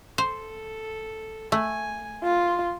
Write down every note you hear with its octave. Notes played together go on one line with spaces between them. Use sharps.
A4 C5
A3 G#5
F4 C6